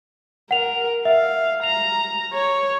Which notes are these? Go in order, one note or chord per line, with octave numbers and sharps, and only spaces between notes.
A#4 F#5 F7
E5 F5
A#5 F7
C#5